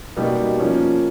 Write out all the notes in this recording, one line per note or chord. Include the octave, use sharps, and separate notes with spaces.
B2 G3 A#3 D#4 G4
F3 A#3 C#4